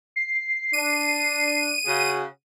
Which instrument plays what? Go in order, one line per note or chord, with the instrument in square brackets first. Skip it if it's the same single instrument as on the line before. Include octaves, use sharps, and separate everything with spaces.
[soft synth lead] C7
[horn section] D4 [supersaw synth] D#7
[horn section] C#3 F#4 G#4